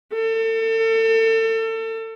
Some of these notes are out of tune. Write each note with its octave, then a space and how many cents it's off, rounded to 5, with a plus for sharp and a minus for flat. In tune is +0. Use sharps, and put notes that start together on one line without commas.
A4 +35